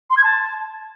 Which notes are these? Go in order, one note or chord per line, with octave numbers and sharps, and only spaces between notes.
C6
G#6
A5